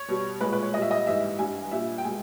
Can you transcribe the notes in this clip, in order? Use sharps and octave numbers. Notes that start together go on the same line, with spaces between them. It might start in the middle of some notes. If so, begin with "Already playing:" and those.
Already playing: C#5
B2 G3
A#2 G#3 B4
B4
C#5
A#2 G3 D#5 E5
D#5
G#2 E3 G3 E5
G2 G3 G#5
A#2 G3 E5
G5
B2 G#3 G#5